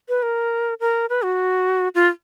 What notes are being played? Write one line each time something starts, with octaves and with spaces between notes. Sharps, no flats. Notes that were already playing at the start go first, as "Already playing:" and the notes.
B4
A#4
A#4
B4
F#4
F4